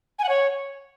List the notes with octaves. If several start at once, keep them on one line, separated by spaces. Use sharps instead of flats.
G#5
F#5
C#5